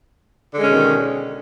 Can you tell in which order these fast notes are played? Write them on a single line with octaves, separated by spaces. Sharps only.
D3 G#3 C#4 B2 D#3